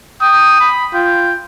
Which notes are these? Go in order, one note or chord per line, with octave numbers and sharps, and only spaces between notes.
G5 D#6
B5
F4 G5